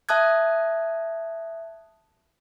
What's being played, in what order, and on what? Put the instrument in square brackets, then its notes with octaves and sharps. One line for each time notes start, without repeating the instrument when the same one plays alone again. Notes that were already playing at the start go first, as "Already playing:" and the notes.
[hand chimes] E5 A5 D#6 F#6 G#6